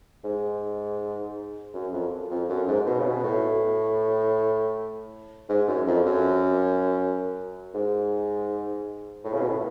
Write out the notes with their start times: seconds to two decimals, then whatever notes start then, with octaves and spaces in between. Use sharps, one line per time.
0.24 G#2
1.74 F#2
1.93 F2
2.31 F2
2.49 F#2
2.68 G#2
2.87 B2
3.00 C#3
3.06 B2
3.24 A2
5.49 G#2
5.68 F#2
5.87 F2
6.06 F#2
7.74 G#2
9.24 A2
9.34 C#3
9.41 B2
9.48 A2